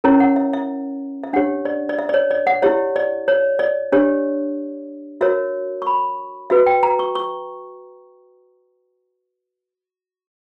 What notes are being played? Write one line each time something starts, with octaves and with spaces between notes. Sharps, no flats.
C#4 E4 A#4 C#5 A#5
F#5
E5
E5
E5
D4 G4 C#5 F#5
D5
D5
E5
D5
C#5
D5
F#5
E4 G4 C#5 E5
D5
C#5
D5
D4 G4 C#5
F#4 A#4 C#5 E5
C#6
B5
F#4 B4 E5
G5
A#5
C#6
C#6